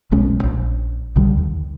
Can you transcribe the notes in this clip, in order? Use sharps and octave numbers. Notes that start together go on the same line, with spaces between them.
D#1 B1 G#3 C#4
A#1
B1 D3 G3
D#2